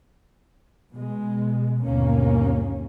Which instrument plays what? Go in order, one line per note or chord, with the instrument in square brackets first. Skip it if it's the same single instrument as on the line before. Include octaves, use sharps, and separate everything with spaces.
[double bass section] B2 G#3
G1 D#2 B2 A#3 C#4